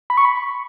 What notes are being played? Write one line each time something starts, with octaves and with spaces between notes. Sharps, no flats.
B5
C#6
B5